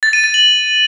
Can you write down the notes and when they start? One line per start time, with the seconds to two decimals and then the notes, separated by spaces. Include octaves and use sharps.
0.03 A6
0.13 D#7
0.24 A6
0.34 F#7